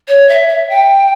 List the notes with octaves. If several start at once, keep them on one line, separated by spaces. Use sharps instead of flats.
C#5
E5
E5
G5